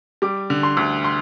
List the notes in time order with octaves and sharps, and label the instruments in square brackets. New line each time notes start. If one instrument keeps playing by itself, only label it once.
[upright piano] G3 D6
D3
C6
D2
C6